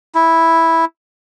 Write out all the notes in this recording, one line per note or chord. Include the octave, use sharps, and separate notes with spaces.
E4